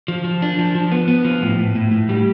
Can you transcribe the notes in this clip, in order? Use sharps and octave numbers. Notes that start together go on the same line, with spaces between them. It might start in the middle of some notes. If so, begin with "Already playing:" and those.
F3
F3
D4
F3
F3
B3
B3
F3
A2
A2
A2
A2
G3